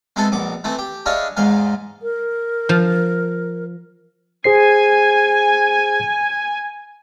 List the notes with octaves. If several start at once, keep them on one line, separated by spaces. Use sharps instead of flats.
G#3 B3 C4 E4 G#4 A4
A#1 B2 D6
E3 A3 C4 E4
G4
D4 E4 G#4 C#5 D#5 F5
E2 G#2 G#3 F5 G#5
A#4
F3
G#4 C5 G#5 C7